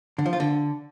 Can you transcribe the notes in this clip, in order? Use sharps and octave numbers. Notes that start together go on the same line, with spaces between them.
D3
F3
F4
D3